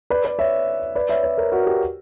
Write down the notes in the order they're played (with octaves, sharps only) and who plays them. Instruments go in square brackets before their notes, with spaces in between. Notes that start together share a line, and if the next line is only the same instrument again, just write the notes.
[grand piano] B4 D5
B4 D5
C#5 E5
B4 D5
C#5 E5
B4 D5
A#4 C#5
F#4 A#4
G4